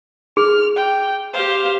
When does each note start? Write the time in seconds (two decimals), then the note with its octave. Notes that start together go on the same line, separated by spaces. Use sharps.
0.37 G#4 F6
0.76 G5
1.33 G4 C5 F5